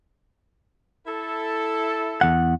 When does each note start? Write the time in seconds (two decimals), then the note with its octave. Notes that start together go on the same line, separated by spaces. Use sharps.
1.07 E4 A4
2.21 E2 F#5